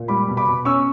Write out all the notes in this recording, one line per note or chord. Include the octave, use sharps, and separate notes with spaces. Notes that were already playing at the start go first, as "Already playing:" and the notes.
Already playing: A#2
G3 B5 D6
B2
B5 D6
B2
C#4 C#6 E6